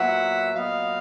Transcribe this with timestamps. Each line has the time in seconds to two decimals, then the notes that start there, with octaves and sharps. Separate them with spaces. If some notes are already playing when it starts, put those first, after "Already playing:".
Already playing: A#2 F#3 B3 E5 F#5
0.55 A#2 F#3 B3 D#5 F5